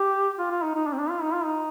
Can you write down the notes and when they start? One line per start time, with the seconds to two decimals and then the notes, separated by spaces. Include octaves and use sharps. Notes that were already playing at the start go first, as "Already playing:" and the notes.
Already playing: G4
0.39 F4
0.51 F4
0.62 D#4
0.75 D#4
0.87 D4
0.93 C4
0.99 D4
1.10 F4
1.22 D#4
1.33 F4
1.44 D#4